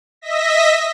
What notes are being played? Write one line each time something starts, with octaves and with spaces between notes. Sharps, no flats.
D#5 E5 A#6 B6